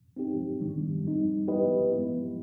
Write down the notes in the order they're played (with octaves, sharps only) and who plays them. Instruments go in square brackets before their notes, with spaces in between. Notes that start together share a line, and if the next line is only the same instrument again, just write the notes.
[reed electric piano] C4 D#4 G4
D#3 G3 B3 D4
G3 C4 D#4
B3 E4 G4 B4 D#5
G#3 B3 E4